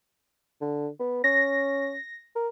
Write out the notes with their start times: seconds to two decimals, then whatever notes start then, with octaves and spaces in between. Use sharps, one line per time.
0.61 D3
1.00 B3
1.24 C#4 A#6
2.36 A#4